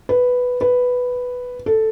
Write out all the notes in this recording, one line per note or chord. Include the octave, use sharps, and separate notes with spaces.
B4
B4
A4